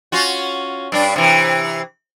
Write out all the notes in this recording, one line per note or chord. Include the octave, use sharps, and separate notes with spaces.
C#4 F4 F#4
G2 D4
C3 E3